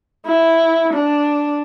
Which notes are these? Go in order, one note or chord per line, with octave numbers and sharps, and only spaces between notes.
E4
D4